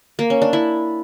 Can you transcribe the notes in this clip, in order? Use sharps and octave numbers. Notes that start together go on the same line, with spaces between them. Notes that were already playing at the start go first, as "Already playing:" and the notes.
A#3
C#4
D4
E4